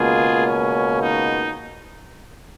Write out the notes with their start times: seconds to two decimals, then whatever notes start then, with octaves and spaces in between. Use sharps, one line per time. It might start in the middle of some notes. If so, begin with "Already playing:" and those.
Already playing: C#2 B2 A#3 F4 G#4
0.46 C#4
1.02 D#4